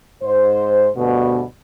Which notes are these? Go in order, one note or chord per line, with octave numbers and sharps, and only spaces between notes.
G#2 C5
D2 G2 B2